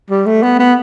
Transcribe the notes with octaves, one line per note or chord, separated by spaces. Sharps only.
G3
A3
B3
B3